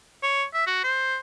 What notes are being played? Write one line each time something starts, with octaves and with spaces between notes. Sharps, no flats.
C#5
E5
F#4
C5